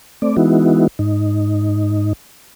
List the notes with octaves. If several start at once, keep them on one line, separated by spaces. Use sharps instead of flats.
A3 C4 D5
E3 G#3 B3 D#4 E4 F#4
G#2 D#4